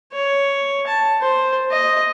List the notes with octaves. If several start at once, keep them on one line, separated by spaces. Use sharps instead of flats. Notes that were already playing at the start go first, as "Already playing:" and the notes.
C#5
A5
C5
D#5